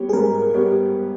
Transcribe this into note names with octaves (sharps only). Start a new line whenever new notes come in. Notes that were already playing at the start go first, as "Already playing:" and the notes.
Already playing: G3 B3 G4 C#5
G#4
G#2 A#4
G3 B3 G4 C#5